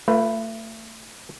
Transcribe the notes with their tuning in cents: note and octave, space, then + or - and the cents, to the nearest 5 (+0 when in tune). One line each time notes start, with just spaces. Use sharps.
A3 +30 F4 +0 B4 +0